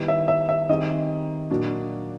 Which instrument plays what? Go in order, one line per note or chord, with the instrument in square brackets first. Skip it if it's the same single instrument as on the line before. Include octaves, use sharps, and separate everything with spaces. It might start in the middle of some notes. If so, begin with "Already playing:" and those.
Already playing: [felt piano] D#3 G3 B3 E4
[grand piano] E5
E5
E5
[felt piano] D#3 G3 C4 D#4 G#4 [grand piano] D#5
[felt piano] A#2 F#3 A#3 D4 F#4